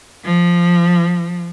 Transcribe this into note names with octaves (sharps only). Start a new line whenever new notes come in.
F3